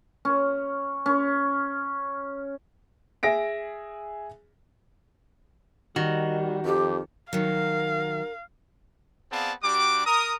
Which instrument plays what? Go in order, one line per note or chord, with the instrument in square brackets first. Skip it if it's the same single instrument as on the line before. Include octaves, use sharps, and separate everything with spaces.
[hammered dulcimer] C#4
C#4
[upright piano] G#4 E5 A#6 D7
[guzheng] D#3 [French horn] G3 [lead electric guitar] F#4
[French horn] F2 [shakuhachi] G4
[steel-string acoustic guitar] D#3 F#3 [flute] A#4 [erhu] F5
[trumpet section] B3 C4 G#4 D5 F5 A5
G3 D4 F#4 G4 D6
A#4 A#5 D#6